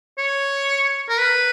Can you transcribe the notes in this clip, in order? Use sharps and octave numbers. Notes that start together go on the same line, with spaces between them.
C#5
A#4
B4